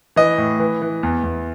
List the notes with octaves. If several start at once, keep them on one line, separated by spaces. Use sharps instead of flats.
E3 D#5
A2
E3
E3
E2
E2